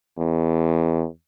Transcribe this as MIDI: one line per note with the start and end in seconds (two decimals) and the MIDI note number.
0.18 1.07 40